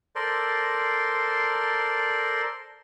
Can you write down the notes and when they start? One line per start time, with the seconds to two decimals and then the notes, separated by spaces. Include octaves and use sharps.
0.16 A4 A#4 C5 D5 C6